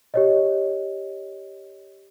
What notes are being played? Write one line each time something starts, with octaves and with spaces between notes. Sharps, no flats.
G4 C#5 D#5